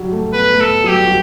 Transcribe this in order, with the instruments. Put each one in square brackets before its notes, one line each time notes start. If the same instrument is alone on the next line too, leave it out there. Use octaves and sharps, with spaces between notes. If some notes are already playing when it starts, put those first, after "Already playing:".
Already playing: [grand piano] F#3 G3
A3
[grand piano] B3 [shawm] B4
[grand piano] A3
[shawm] A4
[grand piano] F#3 [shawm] G4
[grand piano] G3
F#4